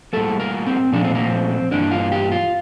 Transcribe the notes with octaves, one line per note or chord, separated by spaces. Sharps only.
A2 G3 A#3 A4
A#4
C4
A#2 F3 A3 D4
C4
A#3
C4
G2 E3 A#3 D4
F4
G4
F4